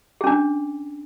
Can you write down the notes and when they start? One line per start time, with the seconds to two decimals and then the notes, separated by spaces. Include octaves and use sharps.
0.21 G#4
0.24 C#4
0.27 D4